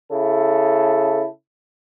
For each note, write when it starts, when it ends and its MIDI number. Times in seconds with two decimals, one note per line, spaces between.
0.11 1.24 49
0.11 1.24 64
0.11 1.24 69